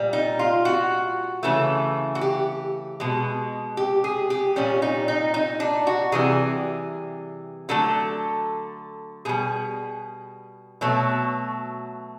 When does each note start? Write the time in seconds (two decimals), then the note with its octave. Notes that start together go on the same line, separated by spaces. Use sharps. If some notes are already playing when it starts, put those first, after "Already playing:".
Already playing: A#2 G3
0.13 D#4
0.39 F4
0.65 F#4
1.43 C#3 E3 A3
2.15 F#4
2.21 G4
3.00 B2 G#3
3.77 G4
4.04 G#4
4.30 G4
4.56 A#2 G3 C#4
4.82 D#4
5.08 D#4
5.34 D#4
5.60 D4
5.87 F#4
6.12 C3 E3 G3 G#4
7.69 D3 F#3 A3 A4
9.25 B2 G3 G#4
10.81 B2 F#3 A3